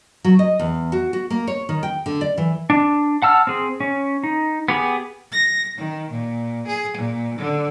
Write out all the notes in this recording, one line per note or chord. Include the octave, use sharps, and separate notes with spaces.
F#3
D#5
E2
F#4
F#4
A#3
C#5
D#3
G5
D3
D5
E3
D4
F#5 A5 E6 F6
C4 G#4
C#4
D#4
B3 G4 G#4
A#6
D#3
A#2
G#4
A#2
D3